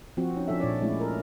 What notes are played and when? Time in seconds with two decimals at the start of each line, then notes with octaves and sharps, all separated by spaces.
0.17 F3 C4 F#4
0.36 C#4 D#4
0.48 F3 D4 A4 E5
0.60 A#2 D4 C#5 D5
0.81 G#3 A3 C#4 E4
1.00 A4 A#4